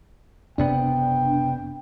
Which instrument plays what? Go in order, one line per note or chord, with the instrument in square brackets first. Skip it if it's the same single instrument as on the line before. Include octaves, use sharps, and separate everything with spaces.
[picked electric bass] F#1 C3 B3 [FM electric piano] D4 [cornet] G5